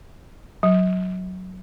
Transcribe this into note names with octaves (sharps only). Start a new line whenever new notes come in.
F#3